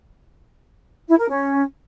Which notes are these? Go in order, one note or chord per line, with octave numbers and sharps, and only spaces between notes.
E4
A#4
C#4